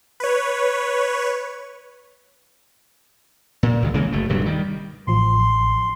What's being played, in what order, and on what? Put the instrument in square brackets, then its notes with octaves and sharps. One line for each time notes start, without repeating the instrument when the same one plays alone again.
[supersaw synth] B4 C#5
[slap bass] A#2
C#2 D#3
C#3 E3 G#3 A#3
F#1 A3
D#1 G2 C3 F#3
D#3 G3
[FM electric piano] A1 F3 [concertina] C6